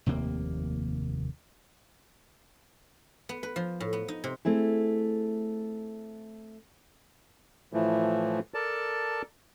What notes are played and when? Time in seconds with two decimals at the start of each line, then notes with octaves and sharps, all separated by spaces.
0.06 F1 D#2 C3 A#3
3.29 B3
3.43 B4
3.56 F3
3.80 A2
3.93 B3
4.08 D#4
4.24 C3
4.45 A3 C4 E4 G#4
7.73 A2 E3 F3 A3
8.54 A4 A#4 D5 A5